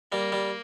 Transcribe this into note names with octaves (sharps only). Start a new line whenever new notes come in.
G3 A#3
G3